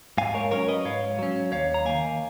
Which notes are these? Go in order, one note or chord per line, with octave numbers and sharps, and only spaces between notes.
G#2 F5 G#5
A#4 C#5
F#3 C#4 A#4 C#5
B4 D#5
G#2 C#5 F5
F#3 C#4
D#2 C#5 F5
A#5
D#3 A#3 F5 G#5